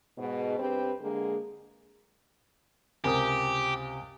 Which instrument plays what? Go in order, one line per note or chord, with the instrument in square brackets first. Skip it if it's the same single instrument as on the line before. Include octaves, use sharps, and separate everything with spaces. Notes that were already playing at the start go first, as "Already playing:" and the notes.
[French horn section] G#2 B2
G2 C4 G4 B4
D3 G#3 A#3 G#4
[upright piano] C#2 C3 A#4 [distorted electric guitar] G4 [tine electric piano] G#5 D#6